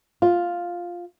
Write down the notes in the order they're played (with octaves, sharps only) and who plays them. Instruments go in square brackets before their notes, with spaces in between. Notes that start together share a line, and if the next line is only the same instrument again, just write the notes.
[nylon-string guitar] F4